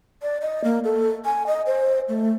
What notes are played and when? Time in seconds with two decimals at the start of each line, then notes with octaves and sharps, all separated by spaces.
0.22 D5
0.41 D#5
0.64 A#3
0.84 A4
1.25 G#5
1.47 D#5
1.66 C5
2.09 A3